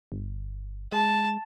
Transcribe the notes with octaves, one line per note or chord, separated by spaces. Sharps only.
G1
G#3 A5